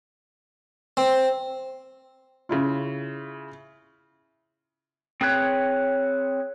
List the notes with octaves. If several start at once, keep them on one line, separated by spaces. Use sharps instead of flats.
C4
C#3 E4 F4
C4 G#4 B4 C#5